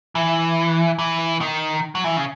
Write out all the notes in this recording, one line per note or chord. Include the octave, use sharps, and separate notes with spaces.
E3
E3
D#3
F#3
E3
C#3